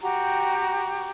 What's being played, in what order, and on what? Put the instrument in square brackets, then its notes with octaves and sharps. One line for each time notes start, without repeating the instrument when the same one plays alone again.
[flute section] F#4 G4 G5 A#5